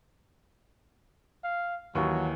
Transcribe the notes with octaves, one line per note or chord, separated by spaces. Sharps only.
F5
D#2 E3 F#3 C#6